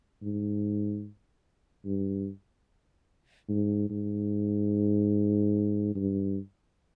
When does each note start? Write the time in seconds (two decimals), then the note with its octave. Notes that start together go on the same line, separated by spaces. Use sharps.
0.22 G#2
1.86 G2
3.49 G#2
3.90 G#2
5.95 G2